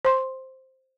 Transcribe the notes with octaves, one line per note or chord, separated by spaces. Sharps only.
C5 C6